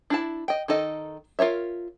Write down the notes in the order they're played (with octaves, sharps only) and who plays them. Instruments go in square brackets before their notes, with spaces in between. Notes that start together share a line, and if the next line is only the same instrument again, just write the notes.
[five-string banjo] D4 E4 A5
D#5 G5
D#3 D#4 A4 D#5
F4 A#4 C#5 E5